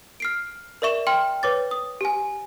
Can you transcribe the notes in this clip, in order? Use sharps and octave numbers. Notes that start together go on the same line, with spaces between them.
F6 C7 D7
A#4 D5 E5 C#6 E7
G5 C6 F6
B4 C#5 D6 A6
D#6
G4 G#5